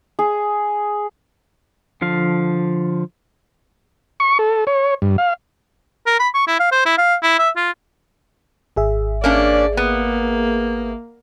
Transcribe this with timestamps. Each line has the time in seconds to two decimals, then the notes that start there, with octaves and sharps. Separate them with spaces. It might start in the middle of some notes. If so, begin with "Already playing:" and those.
0.19 G#4
2.02 D3 F3 F5
4.20 C#6
4.39 A4
4.67 C#5
5.02 G2
5.18 F5
6.07 A#4
6.20 B5
6.34 C#6
6.47 E4
6.60 F5
6.72 C5
6.86 E4
6.98 F5
7.22 E4
7.39 E5
7.57 F4
8.76 G#1 G#4 E5
9.24 A#3 C#4 D4 D5
9.77 A#3 B3